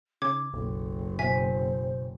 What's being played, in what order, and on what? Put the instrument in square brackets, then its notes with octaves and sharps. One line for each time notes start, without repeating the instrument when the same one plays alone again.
[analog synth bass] C#3 [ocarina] D#4 [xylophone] D6 G#6
[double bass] F#1 [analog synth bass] B1 [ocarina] A4
[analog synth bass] B2 [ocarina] C5 [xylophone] E5 G#5 B6